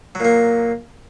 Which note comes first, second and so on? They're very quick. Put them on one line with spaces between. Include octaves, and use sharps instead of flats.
F#3 A#2 A#3